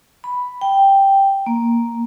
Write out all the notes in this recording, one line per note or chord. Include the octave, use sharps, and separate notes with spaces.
B5
G5
A#3